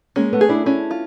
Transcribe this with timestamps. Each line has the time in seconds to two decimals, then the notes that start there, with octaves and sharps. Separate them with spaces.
0.16 G#3 A#3 C#4
0.33 A3 B3
0.41 G#4
0.49 D4 E4
0.66 C#4 D4 E4
0.91 F4